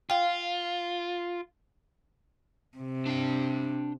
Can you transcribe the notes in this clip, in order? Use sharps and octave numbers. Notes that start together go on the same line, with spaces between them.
F4 F5 G5
C3
D4 G5